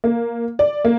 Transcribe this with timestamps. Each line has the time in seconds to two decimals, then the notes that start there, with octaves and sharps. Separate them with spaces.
0.04 A#3
0.59 D5
0.85 A#3